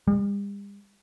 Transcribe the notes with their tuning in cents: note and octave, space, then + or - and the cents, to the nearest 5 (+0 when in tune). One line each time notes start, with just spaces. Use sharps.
G3 +45